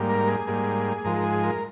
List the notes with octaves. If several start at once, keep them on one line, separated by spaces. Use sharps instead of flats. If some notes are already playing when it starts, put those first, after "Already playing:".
Already playing: G#2 G3 A#3
A#4
G#4
G#2 G3 A#3
G#2 F3 G#3 A#4
A#4
G#4
A#4